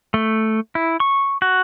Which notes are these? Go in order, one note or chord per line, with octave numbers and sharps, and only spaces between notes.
A3
E4
C#6
F#4